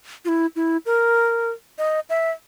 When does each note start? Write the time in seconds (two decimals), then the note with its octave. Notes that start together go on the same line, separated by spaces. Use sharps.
0.25 F4
0.29 E4
0.56 E4
0.86 A#4
1.78 D#5
2.10 E5